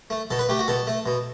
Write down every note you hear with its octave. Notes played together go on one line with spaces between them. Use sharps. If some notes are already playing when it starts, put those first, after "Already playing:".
A3
B2 A4
B4
A3 G4
F#4
B2 A4
A3
B2